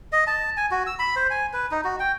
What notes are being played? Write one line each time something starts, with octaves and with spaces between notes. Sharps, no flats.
D#5
A5
G#5
F#4
E6
B5
C5
G#5
B4
D#4
F#4
G5